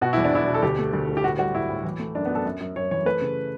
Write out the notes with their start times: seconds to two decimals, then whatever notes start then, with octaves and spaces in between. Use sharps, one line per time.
0.01 B2 F#4
0.13 E2 E4
0.25 D4
0.32 E2 E4
0.48 B2
0.54 A4
0.62 D2 G4
0.79 A3
0.93 D2
1.08 D2
1.17 G4
1.24 A2 F#4
1.38 G3 F#4
1.54 A2 E4
1.69 A2
1.84 E3
1.99 A3
2.15 F#2 D4
2.25 B3
2.30 F#2
2.35 A4
2.45 F#2
2.60 F#2
2.76 F#2 C#5
2.91 E3 C#5
3.05 A3 B4
3.21 C#3